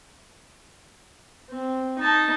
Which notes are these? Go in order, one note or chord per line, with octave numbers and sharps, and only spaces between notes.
C4
D#4 A5